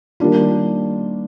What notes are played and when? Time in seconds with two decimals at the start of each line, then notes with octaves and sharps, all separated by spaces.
0.20 D#3 G3 A#3 D4 F4